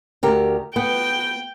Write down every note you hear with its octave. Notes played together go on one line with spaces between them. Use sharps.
D2 G4 A#4
B3 G5